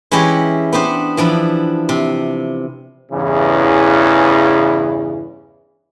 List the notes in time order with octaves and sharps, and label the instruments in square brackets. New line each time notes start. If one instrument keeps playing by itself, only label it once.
[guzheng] E3 G#3 C#4 E4 G4 C#5
B3 D4 G4 C5
E3 F3 D4 E4
C3
[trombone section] E2 G2 C#3 E3